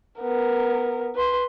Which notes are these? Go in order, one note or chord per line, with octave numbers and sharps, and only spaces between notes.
B3 A#4
B4 C6